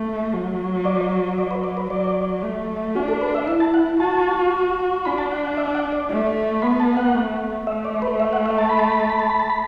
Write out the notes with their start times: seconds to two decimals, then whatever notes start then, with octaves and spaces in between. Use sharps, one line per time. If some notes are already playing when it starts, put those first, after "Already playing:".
Already playing: A3
0.33 F#3
0.85 D5
1.38 D5
1.51 B4
1.64 D5
1.77 B4
1.90 F#3 D5
2.43 A3
2.95 D4 F#4
3.08 A4
3.21 B4
3.35 E5
3.48 E4 E5
3.60 A5
3.74 F#5
4.00 F#4 A5
5.05 D4 B5
5.18 A5
5.32 F#5
5.44 F#5
5.57 E5
5.75 F#5
5.92 D5
6.10 A3
6.62 B3 B5
6.80 A5
6.97 F#5
7.14 A3
7.67 A3 E5
7.85 D5
8.02 B4
8.20 E5
8.33 F#5
8.46 E5
8.58 A5
8.69 B5
8.79 A5
8.90 B5
8.99 A5
9.10 B5
9.19 A5
9.30 B5
9.40 A5
9.50 B5